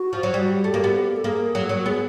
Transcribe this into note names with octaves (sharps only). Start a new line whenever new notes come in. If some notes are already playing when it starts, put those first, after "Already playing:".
Already playing: F#4
F3
F#3
G3
A3 G4
A#3
B3
A4
A#3 G#4
F#3
F#3
B3 G#4